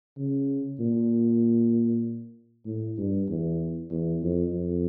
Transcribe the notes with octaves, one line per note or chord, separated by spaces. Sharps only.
C#3
A#2
A2
G2
E2
E2
F2
F2